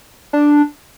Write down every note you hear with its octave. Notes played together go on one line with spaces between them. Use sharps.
D4